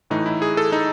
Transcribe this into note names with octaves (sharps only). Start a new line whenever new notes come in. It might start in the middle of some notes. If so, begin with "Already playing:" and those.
A2 E3 A3 D#4
E4
G#4
A4
D#4